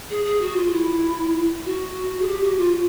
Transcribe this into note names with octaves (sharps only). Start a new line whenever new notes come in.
G#4
G#4
F#4
F4
E4
F#4
G#4
G4
F#4
F4